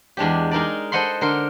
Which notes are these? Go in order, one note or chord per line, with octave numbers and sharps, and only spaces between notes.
E2 G#3 D4 G4
G#3 D#4 A#4 D5
A4 C5 D#5 F#5 B5 C6
D3 A#4 C6